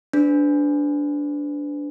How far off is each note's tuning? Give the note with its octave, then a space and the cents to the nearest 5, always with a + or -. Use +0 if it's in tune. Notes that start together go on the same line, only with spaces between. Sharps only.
D4 -10 G#4 -15 B4 +40